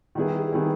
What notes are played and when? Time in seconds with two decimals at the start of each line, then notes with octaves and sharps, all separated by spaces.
0.15 D#3 G3 B3 E4 G#4
0.52 D#3 G3 B3 E4 G#4